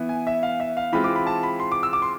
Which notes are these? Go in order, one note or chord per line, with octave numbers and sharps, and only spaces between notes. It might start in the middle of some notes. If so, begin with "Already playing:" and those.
Already playing: E3 B3 E4
G#5
E5
F5
E5
F5
E3 G#3 C4 F4 B5
D6
B5
A5
B5
C6
D6
E6
D6
C6